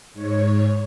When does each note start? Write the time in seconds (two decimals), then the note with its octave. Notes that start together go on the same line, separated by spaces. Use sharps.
0.14 G#2 C#5